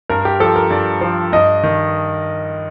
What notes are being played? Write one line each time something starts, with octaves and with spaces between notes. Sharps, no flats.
G2 A#4
G4
F3 A4
A#4
G2 D5
F3
G2 D#5
D#3